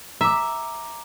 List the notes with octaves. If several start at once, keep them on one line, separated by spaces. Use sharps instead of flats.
E5 A#5 D6